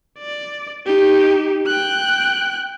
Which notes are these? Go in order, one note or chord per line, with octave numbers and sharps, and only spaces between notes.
D5
D#4 G4
G5 F#6